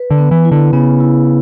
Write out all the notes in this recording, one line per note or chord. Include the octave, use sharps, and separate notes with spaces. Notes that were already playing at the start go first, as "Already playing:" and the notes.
Already playing: B4
D3
B3
E3
E4
D3
C#3 B3
E4